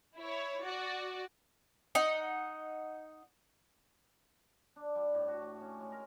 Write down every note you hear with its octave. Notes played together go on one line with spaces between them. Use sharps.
E4 C#5
F#4 D5
D#4 F#5
D4
G3
A2
F#4
A3
C#4
G#3
A#4